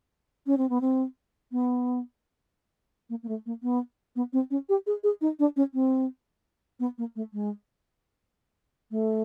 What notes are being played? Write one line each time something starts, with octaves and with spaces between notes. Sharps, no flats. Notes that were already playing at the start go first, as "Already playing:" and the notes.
C#4
C4
B3
C4
B3
A#3
A#3
A3
A#3
B3
B3
C4
C#4
G4
G#4
G#4
D#4
D4
C#4
C4
B3
A#3
A3
G#3
A3